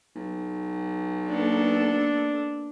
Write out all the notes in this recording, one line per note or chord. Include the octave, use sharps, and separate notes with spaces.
B1
A#3 B3 D4 A4